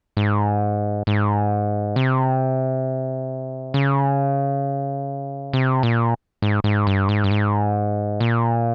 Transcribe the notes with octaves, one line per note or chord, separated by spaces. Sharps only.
G#2
G#2
C3
C#3
C3
A#2
G#2
G#2
G2
G#2
G2
G#2
A#2